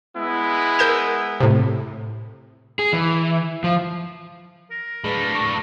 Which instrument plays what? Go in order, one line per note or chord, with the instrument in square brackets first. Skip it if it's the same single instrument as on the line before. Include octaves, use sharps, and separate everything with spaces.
[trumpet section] G#3 B3 E4
[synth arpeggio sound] A#4 G6 E7
A2 C3
[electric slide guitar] G#4
E3
F3
[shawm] A#4
[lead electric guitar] A2 D4 [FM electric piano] G#3 B4 B6
[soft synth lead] C#6